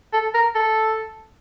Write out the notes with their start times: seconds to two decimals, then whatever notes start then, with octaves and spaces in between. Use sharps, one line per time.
0.13 A4
0.35 A#4
0.55 A4